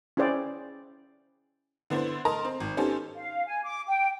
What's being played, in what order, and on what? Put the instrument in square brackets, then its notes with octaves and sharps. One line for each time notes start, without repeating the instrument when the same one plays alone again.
[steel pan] C#4 E4 G#4 C5 D5 G5
[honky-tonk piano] D3 B3 D4 E4 C5
A#4 D#5 A5 A#5 C6
C4
G#1
B3 C#4 D#4 G4 A4 C5
[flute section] F5
G#5
D6
G5